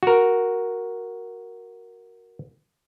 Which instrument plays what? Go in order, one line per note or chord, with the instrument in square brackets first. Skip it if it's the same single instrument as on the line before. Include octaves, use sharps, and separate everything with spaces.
[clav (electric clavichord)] F#4 A#4